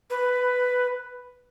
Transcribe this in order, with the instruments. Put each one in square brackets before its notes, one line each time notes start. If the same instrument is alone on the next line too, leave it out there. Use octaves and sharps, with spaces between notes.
[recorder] B4